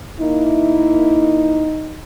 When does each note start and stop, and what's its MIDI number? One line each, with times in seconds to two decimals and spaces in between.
0.20 1.71 58
0.20 2.03 63
0.20 1.71 64